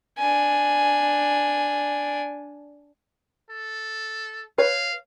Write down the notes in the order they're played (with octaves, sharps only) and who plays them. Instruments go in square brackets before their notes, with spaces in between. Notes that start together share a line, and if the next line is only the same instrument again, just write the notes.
[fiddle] D4 G#5
[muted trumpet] A4
[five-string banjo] B4 C#5 [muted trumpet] F5